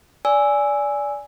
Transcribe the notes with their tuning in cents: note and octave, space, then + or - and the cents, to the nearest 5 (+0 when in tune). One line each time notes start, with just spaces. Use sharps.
D5 -15 G#5 +0 E6 -5